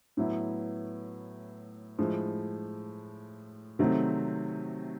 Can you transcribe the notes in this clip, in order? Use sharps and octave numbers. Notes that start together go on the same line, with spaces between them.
A2 F#3 B3 E4
A2 F3 G#3
C3 D#3 F#3 A3 C4